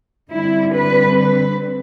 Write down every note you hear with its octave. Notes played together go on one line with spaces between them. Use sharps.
D3 G3 C4 E4
B4
B4